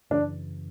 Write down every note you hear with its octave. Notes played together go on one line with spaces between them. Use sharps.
F#2 C#3 E3 D4